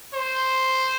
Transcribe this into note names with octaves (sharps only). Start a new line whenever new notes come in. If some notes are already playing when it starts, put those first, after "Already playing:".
C5